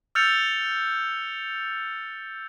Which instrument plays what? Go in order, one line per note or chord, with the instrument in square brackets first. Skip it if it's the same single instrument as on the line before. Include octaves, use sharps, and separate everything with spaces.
[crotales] E6 F6 G6 A6 C#7 F7